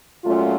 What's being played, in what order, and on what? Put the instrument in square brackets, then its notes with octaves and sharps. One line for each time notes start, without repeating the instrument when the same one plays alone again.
[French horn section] A#2 F#3 A3 C#4 F4